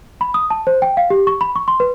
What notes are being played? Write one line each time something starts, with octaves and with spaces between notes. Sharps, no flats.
B5
D#6
A5
C5
G5
F5
G4
C#6
B5
C#6
C6
B4